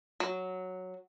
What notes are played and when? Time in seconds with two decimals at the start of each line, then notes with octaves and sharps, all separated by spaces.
0.20 F#3